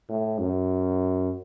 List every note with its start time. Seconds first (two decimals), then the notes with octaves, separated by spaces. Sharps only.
0.09 A2
0.39 F#2